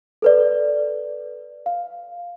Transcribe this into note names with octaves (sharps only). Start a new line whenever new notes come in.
A4 B4 D5
F5